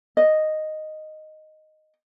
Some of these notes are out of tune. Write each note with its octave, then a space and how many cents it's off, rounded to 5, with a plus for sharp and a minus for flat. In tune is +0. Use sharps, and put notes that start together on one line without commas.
D#5 -5